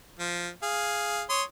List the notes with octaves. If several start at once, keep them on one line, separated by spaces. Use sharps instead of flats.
F3
G#4 F5
C#5 C6 D#6